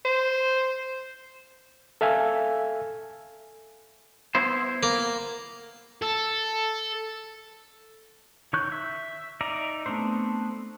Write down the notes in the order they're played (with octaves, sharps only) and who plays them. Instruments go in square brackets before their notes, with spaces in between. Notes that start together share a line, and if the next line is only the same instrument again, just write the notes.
[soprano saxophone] C5
[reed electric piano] A4 E5 F5 G#5
[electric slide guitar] B3 E4 C5
[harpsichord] A#3
[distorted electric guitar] A4
[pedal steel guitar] D#3 C#5 C#6 F#6 G6
E5
D#4 D5 E5 A#5
A3 B3 C4 D4 C5